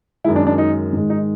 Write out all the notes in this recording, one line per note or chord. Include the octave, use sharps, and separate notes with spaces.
F#2 D#3 G#3 E4
D4
D4
D#4
G#2 D#3 G#3
D#4